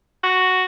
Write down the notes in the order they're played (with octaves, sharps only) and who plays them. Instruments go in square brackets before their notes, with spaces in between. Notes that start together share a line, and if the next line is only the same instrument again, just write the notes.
[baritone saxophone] F#4